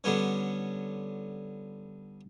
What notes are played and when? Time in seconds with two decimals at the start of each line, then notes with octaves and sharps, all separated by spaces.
0.04 D3 G3 B3 C#4